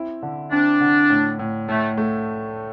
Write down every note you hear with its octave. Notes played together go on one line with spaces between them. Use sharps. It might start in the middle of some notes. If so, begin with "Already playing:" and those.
Already playing: C4 E4
D3
C4 D4
D3
A2
A2
A2 A3
A3